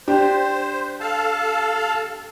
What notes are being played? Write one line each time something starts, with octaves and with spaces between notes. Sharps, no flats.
D4 G4 C5
A4 F5 A5